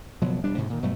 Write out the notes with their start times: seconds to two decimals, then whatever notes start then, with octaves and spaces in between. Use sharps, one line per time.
0.22 F#1 B2 F3 F#3
0.44 E1 G3 D4
0.57 D2 G#2 C3
0.70 A#2 D#3
0.83 G2 B2 F#3 A3